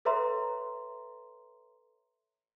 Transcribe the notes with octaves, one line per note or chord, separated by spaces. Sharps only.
A4 B4 C#5 E5 A#5 C6